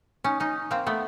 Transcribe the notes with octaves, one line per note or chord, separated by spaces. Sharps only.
C#4 D#4
C#4 D#4
A#3 C4
A3 B3